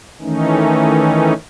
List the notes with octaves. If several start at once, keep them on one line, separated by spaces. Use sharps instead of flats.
D#3 E3 A3 C#4 D#4